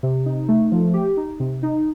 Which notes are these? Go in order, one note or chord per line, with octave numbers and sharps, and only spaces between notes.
C3
D#4
A3
F3
G4
D#4
C3
D#4